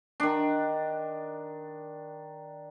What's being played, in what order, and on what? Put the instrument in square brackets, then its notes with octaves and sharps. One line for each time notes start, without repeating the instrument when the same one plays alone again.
[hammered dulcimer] D#3 D4